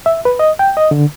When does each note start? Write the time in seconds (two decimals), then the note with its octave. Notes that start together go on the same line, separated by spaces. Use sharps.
0.06 E5
0.25 B4
0.39 D#5
0.59 G5
0.77 D#5
0.91 D3